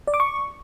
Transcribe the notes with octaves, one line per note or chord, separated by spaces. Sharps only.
D5
D6
C#6